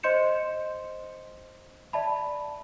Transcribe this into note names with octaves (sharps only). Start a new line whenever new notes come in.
C5 D#5 C6 G6 C#7 E7
D5 E5 A5 B5